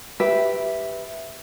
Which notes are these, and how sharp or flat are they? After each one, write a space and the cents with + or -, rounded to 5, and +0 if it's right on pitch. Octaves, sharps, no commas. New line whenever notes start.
G4 +0 B4 +0 E5 +0